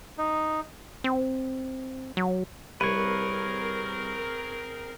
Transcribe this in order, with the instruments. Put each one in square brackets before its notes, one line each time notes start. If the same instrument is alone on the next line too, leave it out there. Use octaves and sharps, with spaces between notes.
[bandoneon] D#4
[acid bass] C4
F#3
[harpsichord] C2 [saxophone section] C4 G#4 A#4 [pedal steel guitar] B4 C#5